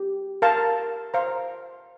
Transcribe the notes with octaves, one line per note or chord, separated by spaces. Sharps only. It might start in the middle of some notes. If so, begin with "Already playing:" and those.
Already playing: G4
A#4 F5 A5
C5 F5 A#5